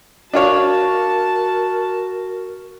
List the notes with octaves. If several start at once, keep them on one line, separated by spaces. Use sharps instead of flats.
D4 F4 F#4 A#4 C#5 A5